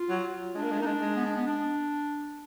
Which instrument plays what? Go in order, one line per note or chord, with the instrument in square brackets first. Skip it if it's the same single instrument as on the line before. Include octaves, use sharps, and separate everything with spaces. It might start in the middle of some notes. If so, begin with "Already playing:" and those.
Already playing: [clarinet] F4
[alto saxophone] F#3
[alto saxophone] G#3 [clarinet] D4
[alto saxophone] A#3
G#3
[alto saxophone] A#3 [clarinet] D#4
[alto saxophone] G#3 [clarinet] D4
[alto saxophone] G#3
[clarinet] B3
D4
B3
D4